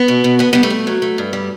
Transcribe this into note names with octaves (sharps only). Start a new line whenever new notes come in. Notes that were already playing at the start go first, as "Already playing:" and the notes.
Already playing: B3
B2
B2
D3 B3
G3 B3
A3
G2
F#3
A3
G2
G3